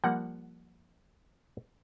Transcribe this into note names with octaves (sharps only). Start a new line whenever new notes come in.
F3 G3 A#3 F#5